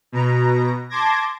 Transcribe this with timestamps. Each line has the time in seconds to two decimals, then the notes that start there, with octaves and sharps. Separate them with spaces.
0.12 B2 A#5
0.90 A5 C6 D6 G#6 A#6